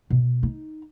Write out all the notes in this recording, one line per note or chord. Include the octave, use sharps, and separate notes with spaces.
B2
D#4